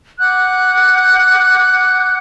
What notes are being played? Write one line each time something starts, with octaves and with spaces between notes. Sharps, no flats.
F#5 D6 F#6 G6